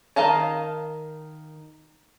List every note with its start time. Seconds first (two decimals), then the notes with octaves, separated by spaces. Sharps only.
0.16 D#3 F5 A5 A#5